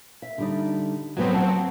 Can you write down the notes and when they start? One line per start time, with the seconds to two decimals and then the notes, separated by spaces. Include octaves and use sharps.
0.22 E5
0.38 D3 G3 D#4
1.17 F2 G#2 F#3 B3 C4
1.34 F#5 A5